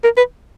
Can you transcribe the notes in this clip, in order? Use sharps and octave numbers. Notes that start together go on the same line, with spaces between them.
A#4
B4